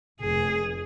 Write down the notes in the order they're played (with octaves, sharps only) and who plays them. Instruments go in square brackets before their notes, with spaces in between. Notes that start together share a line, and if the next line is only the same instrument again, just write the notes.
[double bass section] F1 [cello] G#4